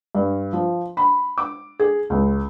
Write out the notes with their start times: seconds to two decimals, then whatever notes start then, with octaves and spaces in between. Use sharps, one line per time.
0.15 G2
0.53 F3
0.97 B5
1.38 D6
1.79 G#4
2.10 C#2